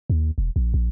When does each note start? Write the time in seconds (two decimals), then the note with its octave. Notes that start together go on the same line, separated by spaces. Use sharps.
0.10 D#2
0.38 E1
0.56 A#1
0.74 A#1